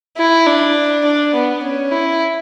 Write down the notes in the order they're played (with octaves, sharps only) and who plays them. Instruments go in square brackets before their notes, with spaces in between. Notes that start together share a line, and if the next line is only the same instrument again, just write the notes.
[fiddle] E4
D4
D4
B3
C#4
E4